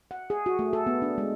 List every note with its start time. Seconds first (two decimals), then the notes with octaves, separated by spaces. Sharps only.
0.11 F#5
0.30 G#4
0.46 F#4
0.59 A3
0.73 A4
0.87 B3
1.02 D4
1.18 G#3